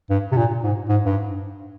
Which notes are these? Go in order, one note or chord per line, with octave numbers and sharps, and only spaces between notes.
G2
C3
A#2
G#2
G#2
G2